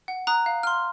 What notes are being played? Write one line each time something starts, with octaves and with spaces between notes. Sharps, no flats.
F#5
A#5 D#6 F#6
F5
C6 F6